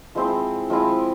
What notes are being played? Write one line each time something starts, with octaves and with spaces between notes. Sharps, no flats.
F3 G#3 C4 E4
F3 G#3 C4 E4